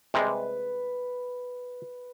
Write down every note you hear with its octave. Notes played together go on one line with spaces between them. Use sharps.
C3 G3 G#3 B4